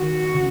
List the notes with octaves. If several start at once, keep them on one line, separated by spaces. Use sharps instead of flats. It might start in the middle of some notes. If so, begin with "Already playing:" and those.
Already playing: D#3 F#4
C#3